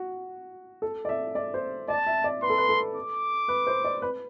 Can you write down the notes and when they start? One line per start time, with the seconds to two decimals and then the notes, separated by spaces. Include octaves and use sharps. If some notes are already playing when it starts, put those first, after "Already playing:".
Already playing: F#4
0.82 A4
1.05 D5
1.09 E5
1.35 D5
1.54 C5
1.88 D5 A5
2.07 E5
2.24 D5
2.42 B4 C6
2.50 A4
2.58 B4
2.69 A4
2.96 D6
3.48 B4
3.67 C5
3.84 D5
4.02 B4